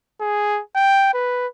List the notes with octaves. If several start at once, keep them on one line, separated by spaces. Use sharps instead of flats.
G#4
G5
B4